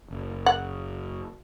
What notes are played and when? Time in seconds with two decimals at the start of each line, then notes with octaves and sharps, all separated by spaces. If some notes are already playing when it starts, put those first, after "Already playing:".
0.11 F#1
0.46 F#5